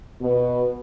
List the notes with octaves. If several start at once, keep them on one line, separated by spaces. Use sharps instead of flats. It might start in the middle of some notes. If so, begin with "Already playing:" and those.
B2